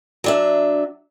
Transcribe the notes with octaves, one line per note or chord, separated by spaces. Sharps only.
F#3 D4 E5